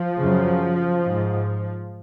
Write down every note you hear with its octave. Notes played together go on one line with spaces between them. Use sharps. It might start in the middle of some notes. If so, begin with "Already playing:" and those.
Already playing: F3
F#2 C#3
G#2